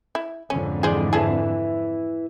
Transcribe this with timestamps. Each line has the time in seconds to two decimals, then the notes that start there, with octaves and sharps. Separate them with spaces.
0.15 E4
0.50 F2 G#2 D3 C#4
0.83 E3 G#3 G#4 C5 D5
1.13 E4 G#4 A4 B4 E5